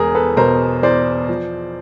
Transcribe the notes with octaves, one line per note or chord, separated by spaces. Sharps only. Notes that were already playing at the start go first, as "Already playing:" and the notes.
Already playing: E1 E2 G#4 A#4
A4 B4
B2 A#4 C5
E2 C5 D5
F3